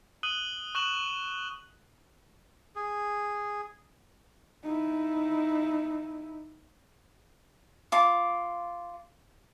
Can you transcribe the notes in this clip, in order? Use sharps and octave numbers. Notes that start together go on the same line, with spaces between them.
D#6 F#6 D#7 F#7 G7
C#6 F#6 E7 F#7
G#4
D#4 E4
F4 D6